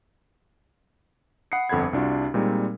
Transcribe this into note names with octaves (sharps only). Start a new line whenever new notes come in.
F#5 B5 D#6 C7 C#7
G1 F2 A4 F#5 B5 G#6
C2 D4 F4 F#4
A#2 G3 G#3 C4 D#4 A#4